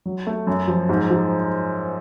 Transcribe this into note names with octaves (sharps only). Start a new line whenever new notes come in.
F#3
A3
F#2
F3
G#2
F3